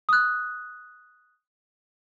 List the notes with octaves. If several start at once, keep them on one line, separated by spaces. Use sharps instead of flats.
D#6 F#6